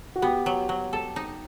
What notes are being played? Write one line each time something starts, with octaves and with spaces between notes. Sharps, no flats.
F#4
B3 G4
F#3
F#3
A4
D#4